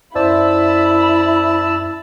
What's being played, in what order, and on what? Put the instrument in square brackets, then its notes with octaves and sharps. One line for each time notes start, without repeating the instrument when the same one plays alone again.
[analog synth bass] F#2 [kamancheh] E4 B5 [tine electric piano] C5 D5 [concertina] A5 E6